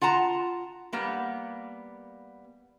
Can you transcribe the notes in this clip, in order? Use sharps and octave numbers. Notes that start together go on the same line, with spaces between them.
F4 F#5 A5 A#5
G3 A#3 B3